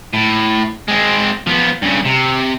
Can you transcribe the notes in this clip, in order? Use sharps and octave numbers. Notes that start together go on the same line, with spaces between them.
A2
G#3 C4
F3 B3
G2 C#3
C3